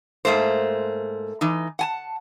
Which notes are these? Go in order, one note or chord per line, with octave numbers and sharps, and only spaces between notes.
G#2 C#3 A3 A#3 C5
E3 D#4
F#5 G#5 A5